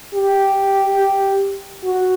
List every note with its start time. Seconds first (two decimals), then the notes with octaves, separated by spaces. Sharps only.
0.14 G4
1.84 F#4